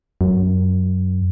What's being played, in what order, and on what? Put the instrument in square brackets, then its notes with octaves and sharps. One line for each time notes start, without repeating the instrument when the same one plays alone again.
[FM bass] F#2